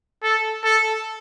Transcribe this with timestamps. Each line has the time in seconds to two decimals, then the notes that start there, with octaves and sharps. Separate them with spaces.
0.23 A4
0.64 A4